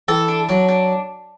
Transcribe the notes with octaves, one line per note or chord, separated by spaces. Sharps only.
E3 A4
D4
F#3 D4
D4